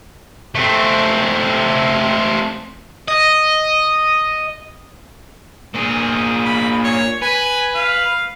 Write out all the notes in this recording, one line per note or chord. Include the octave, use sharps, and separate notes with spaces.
A3 C4
D#5
A#2 G#4
B5
C#5
B4 G#5
F5